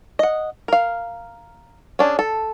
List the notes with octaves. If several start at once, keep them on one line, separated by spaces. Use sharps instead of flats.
D#5 F#5
A#4 F5
C#4 D4 G#4
A4